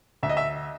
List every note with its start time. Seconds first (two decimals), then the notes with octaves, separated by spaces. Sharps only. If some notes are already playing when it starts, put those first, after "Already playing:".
0.23 D2 E5
0.29 D#5
0.37 E5